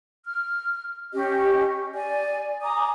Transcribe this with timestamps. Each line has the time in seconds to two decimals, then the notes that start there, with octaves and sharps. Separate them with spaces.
0.25 F6
1.13 C#4 G4 D#5
1.95 D5 G#5
2.62 G#5 A#5 D6 D#6